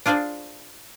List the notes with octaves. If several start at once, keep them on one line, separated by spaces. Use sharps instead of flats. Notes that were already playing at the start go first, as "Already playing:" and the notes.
D4 F4 G#4 C5 D5